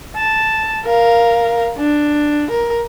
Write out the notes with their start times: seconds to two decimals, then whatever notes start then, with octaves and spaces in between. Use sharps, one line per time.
0.16 A5
0.85 A#4 F5
1.78 D4
2.51 A#4